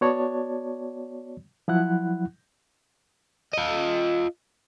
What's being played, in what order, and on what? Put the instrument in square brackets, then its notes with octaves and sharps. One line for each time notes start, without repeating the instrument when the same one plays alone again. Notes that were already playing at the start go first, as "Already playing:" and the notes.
[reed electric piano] B3 F#4 C#5 D5 A5
F3 F#3 E4 F#5 F#6
[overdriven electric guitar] F4 D#5